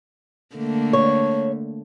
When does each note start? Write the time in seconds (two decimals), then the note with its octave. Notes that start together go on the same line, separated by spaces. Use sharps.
0.56 D3 A3 A#3
0.93 C#5